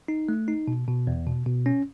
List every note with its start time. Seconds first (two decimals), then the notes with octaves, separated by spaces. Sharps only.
0.08 D#4
0.29 A3
0.48 D#4
0.68 B2
0.87 B2
1.07 E2
1.26 B2
1.46 B2
1.66 C#4